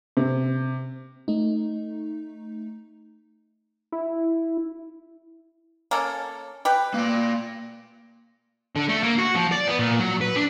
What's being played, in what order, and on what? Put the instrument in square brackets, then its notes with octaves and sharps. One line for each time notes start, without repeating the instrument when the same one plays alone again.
[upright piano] C3
[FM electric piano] A3 D#4
[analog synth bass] E4
[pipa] A#3 C#4 A4
G4 B4
[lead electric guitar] A#3 D5
[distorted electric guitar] D3
A3
A#3
F#4
F3
D5
B3
A#2
F#3
B4
D4